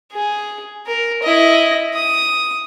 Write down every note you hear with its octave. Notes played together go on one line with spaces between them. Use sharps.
G#4
A#4
E4 D#5
D#6